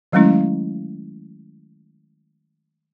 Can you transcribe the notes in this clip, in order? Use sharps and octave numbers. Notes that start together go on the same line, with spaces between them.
D#3 F#3 G#3 A3 C#4 E4